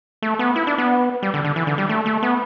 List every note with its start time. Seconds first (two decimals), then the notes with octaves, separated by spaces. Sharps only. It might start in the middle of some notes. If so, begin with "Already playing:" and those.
0.22 A3
0.39 B3
0.56 E4
0.67 D4
0.78 B3
1.23 G3
1.34 D3
1.44 D3
1.56 E3
1.67 D3
1.78 G3
1.89 A3
2.06 A3
2.23 B3